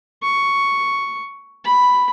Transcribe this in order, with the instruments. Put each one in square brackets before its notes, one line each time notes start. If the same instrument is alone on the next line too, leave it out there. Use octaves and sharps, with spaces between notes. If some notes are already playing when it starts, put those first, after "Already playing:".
[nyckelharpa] C#6
B5